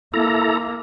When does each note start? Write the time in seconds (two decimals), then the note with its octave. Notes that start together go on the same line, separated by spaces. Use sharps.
0.14 A#3 E4 A4 A#5